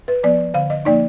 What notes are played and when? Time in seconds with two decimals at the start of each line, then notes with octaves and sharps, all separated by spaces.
0.08 B4
0.23 F3 B3 D5
0.54 D3 F5
0.70 D#5
0.85 F3 A#3 D#4 D5